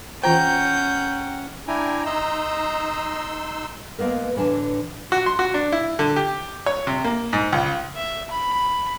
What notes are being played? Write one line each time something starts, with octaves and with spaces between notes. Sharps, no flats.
E3 C#4 F4 C5 F#5 G5 A#5 G6
D4 E4 G5 G#5 A#5
D#4 D#5 A#5 C6 E6
G#3 A#3 B3 A#4
A2 D3 E3 D4 G#5 A5
F#4
C6
F#4
D4
E4
D3
G4
C#5
C3
A#3
G#2
C#2
E5
B5